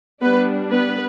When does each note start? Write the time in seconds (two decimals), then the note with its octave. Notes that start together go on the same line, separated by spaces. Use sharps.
0.22 G3 B3 D4 B4
0.71 B3 B4